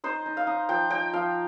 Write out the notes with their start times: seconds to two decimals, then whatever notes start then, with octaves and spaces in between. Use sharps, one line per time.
0.04 D#4 C5
0.26 D#4
0.37 F5
0.47 D#4
0.69 F3 G5
0.90 D#4 G5
1.13 F3 F5